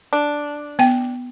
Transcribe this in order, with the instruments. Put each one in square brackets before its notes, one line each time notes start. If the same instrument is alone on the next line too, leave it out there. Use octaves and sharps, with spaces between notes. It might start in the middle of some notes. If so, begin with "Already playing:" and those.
[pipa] D4
[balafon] B3 G5